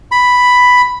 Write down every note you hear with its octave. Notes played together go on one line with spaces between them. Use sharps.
B5